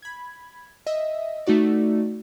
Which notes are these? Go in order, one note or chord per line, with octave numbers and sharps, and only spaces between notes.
B5 G#6
D#5 E5
A3 D#4 F#4 D5